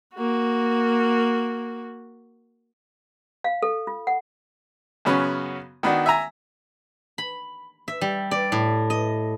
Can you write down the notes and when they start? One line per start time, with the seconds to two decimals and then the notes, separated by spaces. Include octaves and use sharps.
0.16 A#3 F#4
3.44 F5
3.62 A4
3.87 F4
4.07 F#5
5.05 F#2 C#3 B3 C#4 F#4
5.83 D#3 B3 D4 F#4
6.06 E5 G#5 A#5
7.18 B5
7.88 E5
8.01 G3
8.31 D5
8.52 A2
8.90 D#5